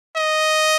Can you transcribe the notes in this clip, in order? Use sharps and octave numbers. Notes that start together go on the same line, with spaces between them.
D#5